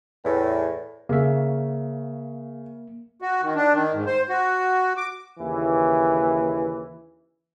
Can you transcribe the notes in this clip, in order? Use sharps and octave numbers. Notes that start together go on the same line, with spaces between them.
E2 A2
C#3 A#3 E5
F#4
D#3
D4
D#3
G#2
C5
F#4
D6
D#2 C#3 E3